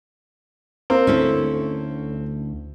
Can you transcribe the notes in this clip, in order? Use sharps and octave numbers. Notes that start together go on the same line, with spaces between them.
A#3 C4
D2 C#4 E4 A4